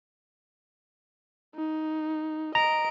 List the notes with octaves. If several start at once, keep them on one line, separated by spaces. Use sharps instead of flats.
D#4
D#5 A#5 D7